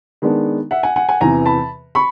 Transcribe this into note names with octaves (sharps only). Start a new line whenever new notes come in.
D#3 G#3 B3 D4
E5 F#5
F#5 G#5
F#5 G#5
F#5 G#5
E2 C3 E3 G#5 A#5
A5 B5
B5 C#6